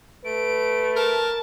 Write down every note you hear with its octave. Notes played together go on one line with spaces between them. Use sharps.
A3 B4 D7
A#4 A5